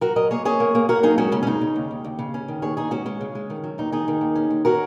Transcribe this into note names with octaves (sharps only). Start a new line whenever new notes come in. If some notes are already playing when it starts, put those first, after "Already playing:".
F#3 F#4 A#4
F#3 A#4 D#5
A#3 G#4 C#5
C#4 G#4 C#5
A#3
A#3
A#3 F#4 A#4
F#3 D#4 G#4
G#3 C#4 F#4
C#3 C#4
C#4
C#3 D#4
C#3
D#2
D#2
D#2
C#3
C#4
D#3
D#2 G#4 C#5
D#2 D#4 G#4
G#3 C#4 F#4
G#3 C#4
C#3
G#3
D#3
F#3
D#2 D#4
D#3 D#4 G#4
D#3
D#2
C#4
D#2
C#4 F#4 A#4